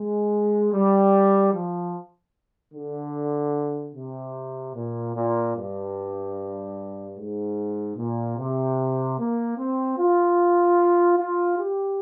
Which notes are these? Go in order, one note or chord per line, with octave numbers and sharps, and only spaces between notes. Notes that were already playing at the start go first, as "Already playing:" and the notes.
Already playing: G#3
G3
F3
D3
C3
A#2
A#2
G2
G#2
A#2
C3
A#3
C4
F4
F4
G4